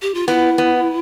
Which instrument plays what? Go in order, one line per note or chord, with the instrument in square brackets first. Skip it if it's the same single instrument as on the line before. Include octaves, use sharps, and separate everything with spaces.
[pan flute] G4
F4
[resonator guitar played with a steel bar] B3 [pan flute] E4
[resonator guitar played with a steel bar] B3